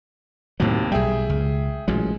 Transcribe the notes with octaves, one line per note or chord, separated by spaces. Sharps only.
D#2 A2 C3 F#3
B1 G3 G#4 E5 G5
C#2
A1 A#2 F#3 G#3